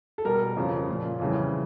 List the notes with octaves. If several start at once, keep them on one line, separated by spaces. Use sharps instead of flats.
A4
B2 G3 A#4
F2 C#3 F3
A#2 F3
F2 C#3 E3 G3